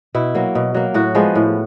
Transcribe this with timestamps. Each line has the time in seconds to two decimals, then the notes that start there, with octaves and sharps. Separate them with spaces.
0.15 B2 E4
0.35 F#3 A#3
0.55 B2
0.74 F#3 A#3
0.94 A2 F#4
1.15 F3 G#3 B3
1.35 A2